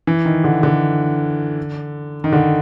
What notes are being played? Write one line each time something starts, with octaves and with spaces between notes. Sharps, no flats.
E3
D#3
D3
D3
D#3
D3